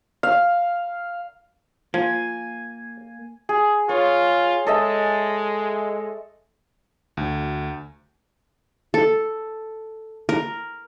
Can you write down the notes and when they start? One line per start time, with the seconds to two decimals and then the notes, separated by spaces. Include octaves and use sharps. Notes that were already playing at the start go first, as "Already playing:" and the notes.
0.23 F5
1.94 F3 A#3 G#5
3.49 G#4
3.89 F4 C#5
4.67 G#3 A4 D#5 E5
7.17 D2
8.94 A4
10.29 A#4